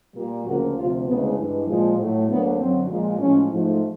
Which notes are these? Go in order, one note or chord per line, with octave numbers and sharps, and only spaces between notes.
A#2 G3 A#3
D2 C#3 F3 A#3 F#4
D2 C3 F3 F4
D2 C#3 E3 G#3 B3
G2 E3 G#3
A#2 F3 G#3
A2 F#3 A3
D2 D3 F#3 A#3 B3
F#2 D3 F#3 C4
A#2 F3 G#3
A2 F3 G#3 C#4
G#2 F3 A3